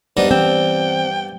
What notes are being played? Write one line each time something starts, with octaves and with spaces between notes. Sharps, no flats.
G2 B3 D4 D#4 C5
E3 C4 G5